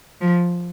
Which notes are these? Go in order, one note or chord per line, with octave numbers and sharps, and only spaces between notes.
F3